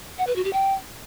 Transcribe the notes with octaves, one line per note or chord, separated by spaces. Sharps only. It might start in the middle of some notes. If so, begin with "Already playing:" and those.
F#5
B4
F#4
G4
G5